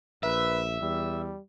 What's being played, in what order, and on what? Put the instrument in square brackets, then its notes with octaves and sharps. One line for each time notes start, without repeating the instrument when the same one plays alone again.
[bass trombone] A#1 [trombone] B4 [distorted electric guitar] E5
[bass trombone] E2 [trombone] G3